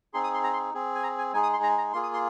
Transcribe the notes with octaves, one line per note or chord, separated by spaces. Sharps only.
C4 D#4 G#4 C6
D#6
C6
A#5
C6
C4 G#4
G#5
A#5
G#5
G#3 D#4 G#4 G#5
D#6
C6
A#5
A#5
A#3 F4 G#4 C6
D#6
C6